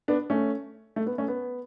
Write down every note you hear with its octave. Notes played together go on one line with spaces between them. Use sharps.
B3 D4
A3 C#4
A3
B3
A3 C#4
B3